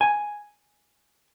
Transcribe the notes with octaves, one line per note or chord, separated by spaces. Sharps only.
G#5